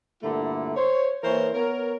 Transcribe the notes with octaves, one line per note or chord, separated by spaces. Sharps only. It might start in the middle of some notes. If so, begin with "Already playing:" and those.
G2 A#2 D3 A3 A#3 E4
C5 C#5
E3 A#3 A#4 C5 C#5
B3 A#4 C#5